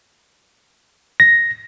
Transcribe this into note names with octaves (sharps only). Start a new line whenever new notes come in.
A#6